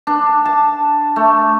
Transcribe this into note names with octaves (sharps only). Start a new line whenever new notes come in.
D4
A5
A3